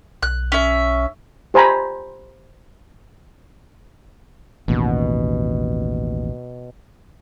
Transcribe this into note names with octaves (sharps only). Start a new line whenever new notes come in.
B1 F#6
C#4 E5
G4 C5 G#5 A#5 B5
A1 D#2 B2